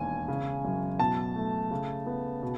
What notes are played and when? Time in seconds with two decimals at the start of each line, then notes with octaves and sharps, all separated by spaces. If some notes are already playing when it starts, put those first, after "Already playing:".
Already playing: E1 D#2 G#5
0.28 C#3
0.65 F#2
1.00 B2 A5
1.36 A3
1.71 C#3
2.06 B3
2.42 B2